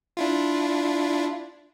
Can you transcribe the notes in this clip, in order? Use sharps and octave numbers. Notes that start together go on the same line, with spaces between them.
D4 E4 F4